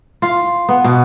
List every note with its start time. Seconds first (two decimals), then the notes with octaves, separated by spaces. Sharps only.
0.22 F4
0.69 B3
0.84 B2